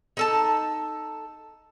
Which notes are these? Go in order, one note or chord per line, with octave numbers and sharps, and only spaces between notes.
D#4 A4 A5